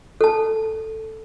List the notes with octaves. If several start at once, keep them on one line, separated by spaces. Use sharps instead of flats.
A4 A5